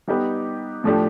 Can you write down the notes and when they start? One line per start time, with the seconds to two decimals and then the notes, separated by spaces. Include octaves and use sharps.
0.08 G3 B3 D#4 G4 B4
0.84 A2 F3 A3 D4 G4